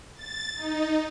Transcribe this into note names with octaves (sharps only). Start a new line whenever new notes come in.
A6
D#4